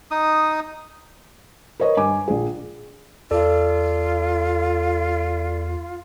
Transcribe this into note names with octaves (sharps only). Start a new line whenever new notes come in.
D#4 D#6
A#4 B4 C#5 D#5
G2 G#5 D6
A#1 G#4
E2 F4 A4 D5